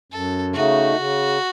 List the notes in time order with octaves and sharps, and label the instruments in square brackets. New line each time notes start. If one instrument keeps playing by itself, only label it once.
[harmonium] F#2 [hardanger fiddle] A4
[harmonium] C#3 A3 D#4 [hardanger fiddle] F#4
[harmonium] C#3